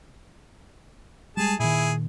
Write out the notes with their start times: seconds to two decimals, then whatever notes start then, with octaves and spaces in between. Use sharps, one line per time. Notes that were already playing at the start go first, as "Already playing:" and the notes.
1.37 G3 G#3 G#4 A5
1.60 A#2 D#3 E4 G#4